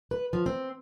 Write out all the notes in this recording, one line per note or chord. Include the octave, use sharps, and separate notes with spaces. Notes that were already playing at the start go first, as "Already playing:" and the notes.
B4
F3
C4